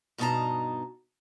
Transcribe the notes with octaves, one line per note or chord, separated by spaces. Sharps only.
G2 B2 D#4 F#4 A5 A#5